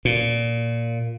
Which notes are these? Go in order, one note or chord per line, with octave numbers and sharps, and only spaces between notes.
A#2